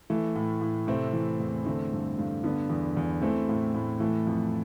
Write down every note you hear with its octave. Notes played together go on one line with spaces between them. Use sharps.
E3 A3
A2
A2
C3 A3 C4
E3
E2
D3 A3 C4
G2
G2
D3 B3 D4
E2
E2
E3 A3 C4
A2
A2
E3 A3
F2